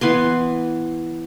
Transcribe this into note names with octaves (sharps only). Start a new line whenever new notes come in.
E3 B3 G#5 C6